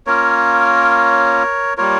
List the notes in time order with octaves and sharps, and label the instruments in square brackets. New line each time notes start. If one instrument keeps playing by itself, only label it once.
[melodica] A#3 C#4 F4 A#4 C#5
G3 A#3 F4 A#4 C#5